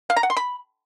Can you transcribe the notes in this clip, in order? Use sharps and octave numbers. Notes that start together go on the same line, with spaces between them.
F5
A#5
F#5
C6
B5